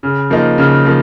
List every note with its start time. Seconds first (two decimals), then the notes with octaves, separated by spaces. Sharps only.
0.03 C#3
0.30 F3 A#3 D#4
0.58 C#3
0.85 F3 A#3